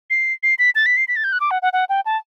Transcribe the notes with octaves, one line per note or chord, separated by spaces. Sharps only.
C7
C7
B6
A6
B6
C7
B6
A6
G6
F#6
D6
F#5
F#5
F#5
G5
A5